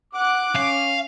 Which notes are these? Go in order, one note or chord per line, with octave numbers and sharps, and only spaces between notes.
F#5 D6 F#6
C#4 F5